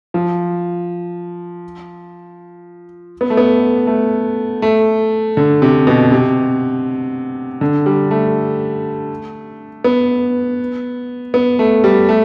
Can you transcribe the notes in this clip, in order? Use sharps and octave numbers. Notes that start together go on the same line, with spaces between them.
F3
B3
A3
B3
A3
A3
D3
C3
B2
C3
D3
G3
A3
B3
B3
A3
G3
A3